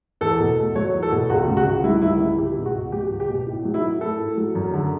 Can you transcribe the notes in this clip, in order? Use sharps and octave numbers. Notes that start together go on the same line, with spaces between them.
E2 A4
B2
A3
F#3 C#5
E2
A4
B2
C#2 F#4
C#3
F#4
C#2
G3 E4
C#2 E4
C#3 E4
C#2 G4
B2
F#4
C#2
F#3 G4
C#2
G4
B2
A2
F#3
E4
A2
A3 A4
A2
F#3
F#2
D3